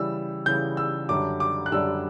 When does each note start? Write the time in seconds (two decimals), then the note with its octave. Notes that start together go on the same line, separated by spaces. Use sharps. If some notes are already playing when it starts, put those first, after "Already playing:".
Already playing: C#3 E3 G3 E6
0.46 C#3 E3 G3 G6
0.77 E6
1.09 F#2 D3 G3 D4 D6
1.40 D6
1.66 F#6
1.72 F#2 D3 G3 D4 E6